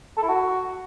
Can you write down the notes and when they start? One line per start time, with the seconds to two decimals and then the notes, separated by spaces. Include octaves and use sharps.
0.17 A4
0.23 E4
0.28 F#4